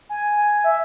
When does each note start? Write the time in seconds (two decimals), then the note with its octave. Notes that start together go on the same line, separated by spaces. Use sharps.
0.09 G#5
0.33 G#5
0.64 E5